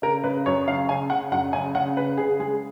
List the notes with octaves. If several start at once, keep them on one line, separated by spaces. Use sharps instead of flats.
C#3 A#4
C#3 B4
F#2 C#5
C#3 F5
C#3 G#5
C#3 F#5
F#2 F#5
C#3 G#5
C#3 F#5
C#3 B4
C#3 G#4
G#3 G#4